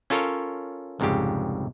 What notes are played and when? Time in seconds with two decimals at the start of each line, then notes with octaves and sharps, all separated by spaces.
0.10 C#4 F4 A4 A#4 C#5
1.00 C2 F2 G#2 C#3 G4